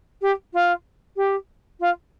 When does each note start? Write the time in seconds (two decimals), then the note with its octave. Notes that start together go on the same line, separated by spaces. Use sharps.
0.22 G4
0.53 F4
1.17 G4
1.80 F4